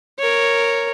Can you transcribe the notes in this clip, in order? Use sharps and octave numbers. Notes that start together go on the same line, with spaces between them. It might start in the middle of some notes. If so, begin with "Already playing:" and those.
A#4 C#5